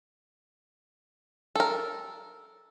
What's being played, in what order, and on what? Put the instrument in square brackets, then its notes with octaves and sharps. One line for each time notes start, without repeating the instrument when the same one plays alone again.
[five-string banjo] A4 A#4